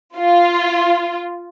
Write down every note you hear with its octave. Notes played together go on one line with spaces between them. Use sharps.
F4